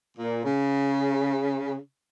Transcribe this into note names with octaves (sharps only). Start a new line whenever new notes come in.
A#2
C#3